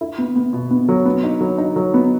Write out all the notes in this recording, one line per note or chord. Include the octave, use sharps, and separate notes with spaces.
E4
B3
B3
B2
B3
F#3
B3
D#4
F#3
D#4
F#3
B3